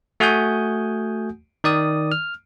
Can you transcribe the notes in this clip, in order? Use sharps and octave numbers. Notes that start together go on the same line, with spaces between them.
A3 F#4 F#5 G#5 D#6 G6
D#3 D5 D#6
F6